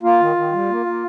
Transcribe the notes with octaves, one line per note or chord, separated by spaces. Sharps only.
A#3 F4
D#3
D#3
G3
A#3
A#3